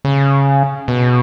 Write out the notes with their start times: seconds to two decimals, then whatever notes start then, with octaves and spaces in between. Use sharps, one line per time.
0.05 C#3
0.88 B2